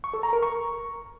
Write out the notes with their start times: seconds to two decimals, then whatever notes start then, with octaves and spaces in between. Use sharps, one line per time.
0.04 C#6
0.14 A4
0.23 A#5
0.33 A#4
0.43 C#6